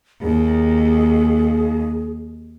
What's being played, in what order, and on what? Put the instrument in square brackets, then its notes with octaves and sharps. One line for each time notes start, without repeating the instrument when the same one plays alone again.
[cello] D#2 [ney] G#4